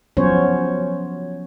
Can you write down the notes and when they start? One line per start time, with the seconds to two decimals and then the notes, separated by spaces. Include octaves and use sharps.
0.17 F3 F#3 B3 C#4 C5 C#5